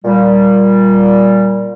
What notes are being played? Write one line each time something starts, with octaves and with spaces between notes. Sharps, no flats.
A#2 G3